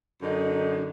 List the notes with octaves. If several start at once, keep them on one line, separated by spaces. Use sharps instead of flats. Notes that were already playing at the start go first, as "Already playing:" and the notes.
F#2 D3 D#4